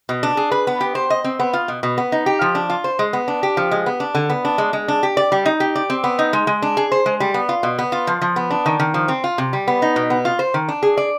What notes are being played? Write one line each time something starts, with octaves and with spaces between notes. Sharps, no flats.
B2
D4
G#4
B4
B3
G4
C5
D#5
C4
B3
F4
B2
B2
B3
D#4
G4
F3
D4
F4
C5
G#3
B3
D4
G4
F3
G#3
B3
D4
D3
B3
D4
G#3
G#3
D4
G4
D5
G3
D#4
G4
D5
C4
B3
D#4
G#3
G#3
D4
G#4
C5
G#3
G3
B3
F4
B2
B3
F4
F3
F3
B3
D4
D#3
D#3
F3
C4
F4
C3
G3
B3
D#4
B2
B3
F4
C5
D#3
D4
G#4
D5